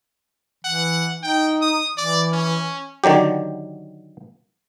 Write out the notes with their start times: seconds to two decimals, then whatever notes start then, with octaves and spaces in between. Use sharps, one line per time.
0.65 E3 F#5
1.23 D#4 G5
1.62 D#6
1.98 E3 D5
2.33 C#4
3.04 D3 D#3 F#3 G4